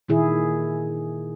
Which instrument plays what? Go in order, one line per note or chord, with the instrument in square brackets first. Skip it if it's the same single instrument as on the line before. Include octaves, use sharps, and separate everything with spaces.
[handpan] A#2 D#3 E4 G#4